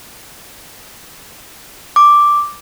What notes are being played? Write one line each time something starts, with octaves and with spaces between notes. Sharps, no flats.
D6